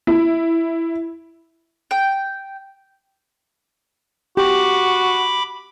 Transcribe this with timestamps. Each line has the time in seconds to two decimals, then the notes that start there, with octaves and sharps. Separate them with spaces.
0.07 E4
1.91 G5
4.37 F#4 G4 B5 D6